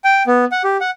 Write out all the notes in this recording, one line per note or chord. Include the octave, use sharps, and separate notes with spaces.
G5
B3
F#5
G4
F#5